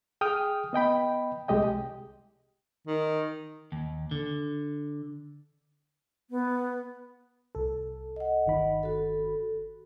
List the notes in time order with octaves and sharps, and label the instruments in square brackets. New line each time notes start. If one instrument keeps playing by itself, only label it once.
[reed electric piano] G#4 G5 D#6 F6
B3 D#5 G5 B5
C2 G#3 G4 D#5 G5
[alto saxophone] D#3
[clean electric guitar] D#2
D3
[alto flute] B3
[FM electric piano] C2 A4
[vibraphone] D#5 F#5
[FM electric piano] G1 D#3 B5
[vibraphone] F#4 A4